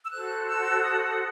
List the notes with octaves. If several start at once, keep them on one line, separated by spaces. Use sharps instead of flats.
E6
F#4 A4 C5 F#6
E6
D#6